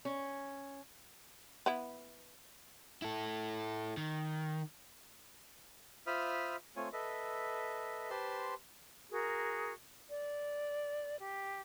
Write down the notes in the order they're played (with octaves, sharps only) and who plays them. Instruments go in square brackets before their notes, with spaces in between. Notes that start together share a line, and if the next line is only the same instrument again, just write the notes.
[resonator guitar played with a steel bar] C#4
[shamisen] B3 E4
[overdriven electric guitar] E4 A4
D#3
[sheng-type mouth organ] F4 C5 E5 B5 D#6 F6
A3 C4 F4 C#5 G#5
A4 B4 D#5 E5
G4 B4 C5 A5 C6
[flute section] F#4 G#4 A#4
D5
G4